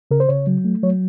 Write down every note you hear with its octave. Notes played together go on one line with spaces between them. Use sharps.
C#3 A#4
C5
C#3 C#5
F#3
A3
F#3 C#5